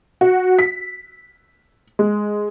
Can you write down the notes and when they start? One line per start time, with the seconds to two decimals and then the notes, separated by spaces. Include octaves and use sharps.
0.21 F#4
0.59 B6
1.99 G#3